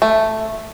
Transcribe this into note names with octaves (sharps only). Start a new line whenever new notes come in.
A3